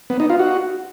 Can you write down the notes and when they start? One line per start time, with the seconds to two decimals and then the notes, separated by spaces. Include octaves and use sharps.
0.10 B3
0.20 D#4
0.30 F4
0.39 F#4